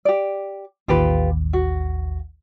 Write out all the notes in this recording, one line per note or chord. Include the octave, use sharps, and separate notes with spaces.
G4 D5
A1 D#2 F4 G4 B4
F#4